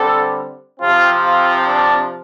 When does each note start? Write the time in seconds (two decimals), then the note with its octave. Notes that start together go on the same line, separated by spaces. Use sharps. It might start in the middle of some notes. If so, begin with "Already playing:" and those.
Already playing: D3 G3 C4 A4
0.80 C3 F3 C4 F4
1.24 F4
1.66 D4